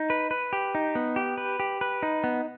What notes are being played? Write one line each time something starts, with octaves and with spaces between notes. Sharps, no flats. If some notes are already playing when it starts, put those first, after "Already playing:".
Already playing: D#4
B4
B4
G4
D#4
B3
G4
B4
G4
B4
D#4
B3